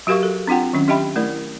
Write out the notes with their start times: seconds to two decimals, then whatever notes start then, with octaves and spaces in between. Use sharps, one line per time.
0.07 F#3 F#4 G4 A#4 F5 C#6
0.23 A4
0.47 C4 D4 F4 F#5 G5
0.73 D#3 F#3 C#4
0.88 D4 G4 D#5 E5 G5 B5
1.16 A3 E4 A#4 D5